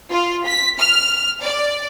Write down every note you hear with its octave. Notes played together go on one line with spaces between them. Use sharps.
F4
B6
F6
D5